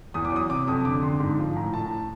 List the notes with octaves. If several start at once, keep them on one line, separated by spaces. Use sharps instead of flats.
E2 D#6
D6
F#3 D#6
C3 D6
F2 D#6
D3 D6
D3 C6
G#2
F3
A2 A#5
A2 A5